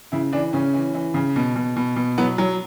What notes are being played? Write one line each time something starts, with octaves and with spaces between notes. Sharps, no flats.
C#3 E4
E3 D4
C#3 C#4
E3
E3
C#3
B2
B2
B2
B2
F#3 B3
F#3